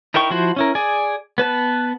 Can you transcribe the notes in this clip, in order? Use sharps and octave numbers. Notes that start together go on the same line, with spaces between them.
D#4 E4 A#4 G5 C#6
F3 E4 F#4 C5
C#4 E4 A#4
G#4 D5 G#5
B3 B4 A5